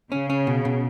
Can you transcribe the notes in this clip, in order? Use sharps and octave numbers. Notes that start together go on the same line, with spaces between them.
C#3 C#4
C#4
B2
B2